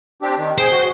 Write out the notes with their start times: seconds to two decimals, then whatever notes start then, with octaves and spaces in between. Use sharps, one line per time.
0.22 C4 D4 G4
0.38 D#3
0.58 G#4 C5 G5
0.71 F#4